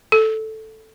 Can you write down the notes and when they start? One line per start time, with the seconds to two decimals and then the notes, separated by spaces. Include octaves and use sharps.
0.12 A4